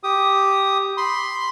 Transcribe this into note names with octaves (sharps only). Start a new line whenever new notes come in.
G4 D#6
B5 C6